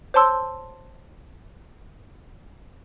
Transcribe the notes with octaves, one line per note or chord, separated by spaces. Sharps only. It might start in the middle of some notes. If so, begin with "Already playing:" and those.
C5 C#5 A5 C6 E6